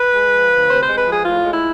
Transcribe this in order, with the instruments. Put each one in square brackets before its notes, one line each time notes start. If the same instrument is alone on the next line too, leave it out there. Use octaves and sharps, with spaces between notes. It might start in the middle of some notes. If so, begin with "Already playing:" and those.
Already playing: [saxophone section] B4
G#3
F3
D2
C3 C5
G#3 C5
B4
F3 G#4
A2 F4
G#3
E4